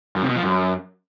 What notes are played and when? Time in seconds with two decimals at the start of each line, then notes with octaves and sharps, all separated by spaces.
0.16 F#2
0.23 C3
0.29 B2
0.36 F3
0.43 F#2